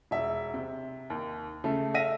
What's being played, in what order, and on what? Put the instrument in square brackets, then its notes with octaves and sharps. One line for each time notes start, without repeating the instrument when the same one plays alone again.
[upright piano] E1 E5
C3
D#2
C#3 A3 A4
E5 F5 A#6 D#7